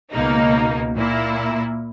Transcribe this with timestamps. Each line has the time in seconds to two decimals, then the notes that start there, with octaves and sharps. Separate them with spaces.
0.12 C#2 B2 A#3 D#4
0.95 A#2 A#3 E4